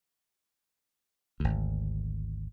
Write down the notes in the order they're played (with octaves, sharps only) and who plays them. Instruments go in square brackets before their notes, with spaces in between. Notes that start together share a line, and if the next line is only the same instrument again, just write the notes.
[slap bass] G#1 D2